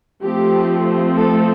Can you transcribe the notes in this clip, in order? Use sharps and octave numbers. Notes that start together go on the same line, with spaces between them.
F3 A3 C4 G4
A4